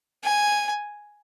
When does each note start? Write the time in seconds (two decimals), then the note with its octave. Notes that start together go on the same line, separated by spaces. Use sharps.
0.23 G#5